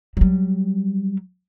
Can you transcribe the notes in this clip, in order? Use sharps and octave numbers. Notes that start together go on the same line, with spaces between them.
F#3 G3